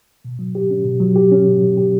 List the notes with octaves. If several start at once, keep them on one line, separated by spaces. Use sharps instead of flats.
B2
F#3
G4
C#4
B2
F#3
G4
C#4
B2
F#3
G4